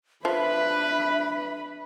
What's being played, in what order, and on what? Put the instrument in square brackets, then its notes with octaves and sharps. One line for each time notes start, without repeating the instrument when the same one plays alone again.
[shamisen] F3 [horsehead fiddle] D4 B5 [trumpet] B4 [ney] E5